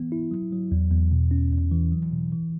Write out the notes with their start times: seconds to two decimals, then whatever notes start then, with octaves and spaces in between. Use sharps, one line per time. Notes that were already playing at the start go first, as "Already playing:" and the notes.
Already playing: E3 B3
0.12 E4
0.31 F#3
0.52 F#3
0.72 E2
0.92 E2
1.12 B2
1.31 C#4
1.52 E2
1.71 E3
1.92 F#3
2.12 B2
2.32 E3